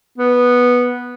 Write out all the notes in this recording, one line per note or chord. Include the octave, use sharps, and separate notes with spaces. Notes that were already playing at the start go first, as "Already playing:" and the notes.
B3